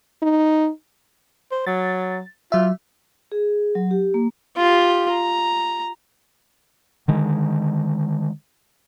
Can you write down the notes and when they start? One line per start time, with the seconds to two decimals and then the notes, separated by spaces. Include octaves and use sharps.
0.22 D#4
1.51 C5
1.67 F#3 A6
2.52 F#3 F4 E5
3.32 G#4
3.75 F#3
3.91 G4
4.14 A#3
4.56 F4 G4
5.10 A#5
7.08 D3 D#3 G#3